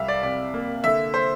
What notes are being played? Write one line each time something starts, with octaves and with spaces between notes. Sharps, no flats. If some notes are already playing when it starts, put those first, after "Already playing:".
Already playing: C2 G3 E5 F5
D5
C3 D5
A#3
D3 E5
C5